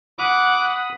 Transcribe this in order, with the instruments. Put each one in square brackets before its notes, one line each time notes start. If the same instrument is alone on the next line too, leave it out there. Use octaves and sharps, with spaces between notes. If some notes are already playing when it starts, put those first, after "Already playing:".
[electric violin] F#5 [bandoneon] B5 D#6 [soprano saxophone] D6